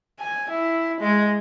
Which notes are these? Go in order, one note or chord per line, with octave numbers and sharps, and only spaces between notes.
G#5
E4
G#3